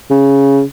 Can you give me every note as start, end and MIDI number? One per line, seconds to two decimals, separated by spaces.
0.10 0.62 49